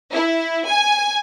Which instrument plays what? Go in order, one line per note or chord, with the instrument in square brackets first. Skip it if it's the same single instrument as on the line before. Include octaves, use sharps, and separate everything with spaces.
[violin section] E4
G#5